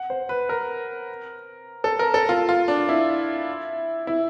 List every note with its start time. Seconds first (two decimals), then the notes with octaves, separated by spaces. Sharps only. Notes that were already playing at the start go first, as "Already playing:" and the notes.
Already playing: F#5
0.10 C5
0.29 B4
0.49 A#4
1.84 A4
1.99 A#4
2.14 A4
2.29 F4
2.49 F4
2.68 D4
2.89 E4
4.07 E4